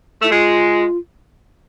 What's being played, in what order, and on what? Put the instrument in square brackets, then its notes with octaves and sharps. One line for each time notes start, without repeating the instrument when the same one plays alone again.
[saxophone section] A3 [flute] E4
[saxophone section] G#3 [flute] F4